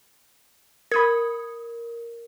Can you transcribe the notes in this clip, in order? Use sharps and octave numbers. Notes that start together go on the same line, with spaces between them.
A#4 B5 D#6 G#6